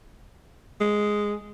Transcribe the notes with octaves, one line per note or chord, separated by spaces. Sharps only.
G#3